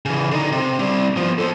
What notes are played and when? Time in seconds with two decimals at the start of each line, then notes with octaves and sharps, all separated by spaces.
0.05 C#3 E3
0.31 D3 D#4
0.52 C3
0.79 G3 C4
1.17 F3 B3
1.38 A4 C5